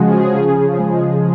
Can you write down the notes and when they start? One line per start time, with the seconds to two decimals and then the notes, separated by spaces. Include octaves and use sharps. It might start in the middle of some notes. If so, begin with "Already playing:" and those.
Already playing: C#3 F3 G#3 F#4 G#4
0.14 C#3
0.20 G#4
0.35 C#3
0.57 C#3
0.79 G#3
1.00 G#3